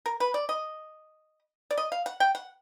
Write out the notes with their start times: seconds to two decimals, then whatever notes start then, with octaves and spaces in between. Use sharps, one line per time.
0.06 A#4
0.20 B4
0.34 D5
0.49 D#5
1.71 D5
1.78 D#5
1.92 F5
2.06 F#5
2.20 G5
2.35 F#5